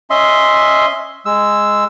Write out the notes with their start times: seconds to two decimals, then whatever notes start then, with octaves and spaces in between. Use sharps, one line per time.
0.10 C#4 D#5 E5 C6
1.26 G#3 E6